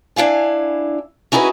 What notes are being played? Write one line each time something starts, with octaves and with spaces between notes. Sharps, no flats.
D4 E4 F5 G#5
C#4 D#4 E4 F#4 G#4 B4